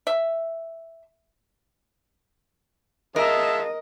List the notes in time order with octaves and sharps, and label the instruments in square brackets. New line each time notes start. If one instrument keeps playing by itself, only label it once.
[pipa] E5
[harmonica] G#3 F4 A5 [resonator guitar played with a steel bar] A#4 [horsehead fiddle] D#5 [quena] E5